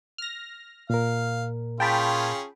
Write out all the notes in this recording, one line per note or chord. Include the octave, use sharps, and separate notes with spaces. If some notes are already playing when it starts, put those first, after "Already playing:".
F6 A#6
A#2 A#4 F5
C#4 F4 G#4 G5 A5 B5